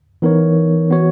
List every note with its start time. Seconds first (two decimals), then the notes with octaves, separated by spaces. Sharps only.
0.22 E3 B3 D#4 A#4 C#5
0.90 E3 B3 F#4 C#5